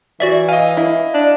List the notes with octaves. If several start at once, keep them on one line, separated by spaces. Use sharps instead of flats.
E3 F#4 D5 E5
D#5 F5 G#5
E4
D4